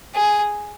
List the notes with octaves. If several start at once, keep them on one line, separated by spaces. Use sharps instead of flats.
G#4